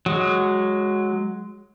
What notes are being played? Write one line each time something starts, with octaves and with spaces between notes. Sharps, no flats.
F#3 G#3